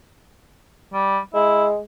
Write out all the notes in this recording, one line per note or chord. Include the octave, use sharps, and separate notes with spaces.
G3
G#3 E4